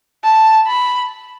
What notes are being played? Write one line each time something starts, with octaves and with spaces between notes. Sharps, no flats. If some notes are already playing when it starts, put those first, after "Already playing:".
A5
B5